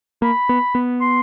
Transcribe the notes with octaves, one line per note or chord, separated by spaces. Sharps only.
A#3 B5
B3
B3
C6